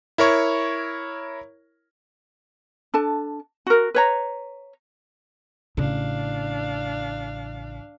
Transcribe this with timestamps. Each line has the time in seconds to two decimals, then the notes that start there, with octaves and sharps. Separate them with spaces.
0.18 E4 A#4 C#5 C#6
2.94 D4 A4 A5
3.67 F#4 A#4
3.94 B4 C#5 A#5
5.77 A1 C#3 D4 F5